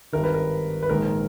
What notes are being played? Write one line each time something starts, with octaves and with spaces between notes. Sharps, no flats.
G#1 G2 D#3 A#4
B4
A#4
B4
A#1 G#2 D#3 A#4